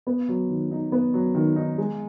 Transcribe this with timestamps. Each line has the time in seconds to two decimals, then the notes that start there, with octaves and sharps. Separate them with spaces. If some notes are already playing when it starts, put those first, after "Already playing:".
0.07 B3
0.29 F#3
0.49 D#3
0.71 D#4
0.92 B3
1.14 F#3
1.35 D#3
1.56 D#4
1.78 G#3